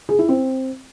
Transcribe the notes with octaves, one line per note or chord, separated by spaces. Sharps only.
G#4
E4
C4